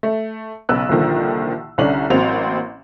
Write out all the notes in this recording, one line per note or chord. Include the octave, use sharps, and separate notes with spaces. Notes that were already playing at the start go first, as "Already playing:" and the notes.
A3
B1 C#3 B3 E6 F#6
C2 A#2 D3 D#3 F3
C2 D3 C#4 D4 F#7
A1 F#3 A#3 C4 F7